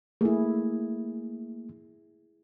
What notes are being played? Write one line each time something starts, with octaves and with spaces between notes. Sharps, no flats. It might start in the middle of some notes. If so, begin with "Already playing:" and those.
A3 A#3 E4 G#4